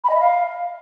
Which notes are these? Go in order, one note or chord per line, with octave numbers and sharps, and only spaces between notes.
B5
D#5
E5
F5